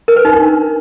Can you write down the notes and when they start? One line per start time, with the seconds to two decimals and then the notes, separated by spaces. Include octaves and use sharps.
0.08 A#4
0.16 B4
0.25 D#4
0.33 D4